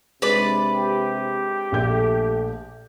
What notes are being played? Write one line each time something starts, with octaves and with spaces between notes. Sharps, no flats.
C3 G#3 D4 B4 D5
G4
A#1 A3 A4 G6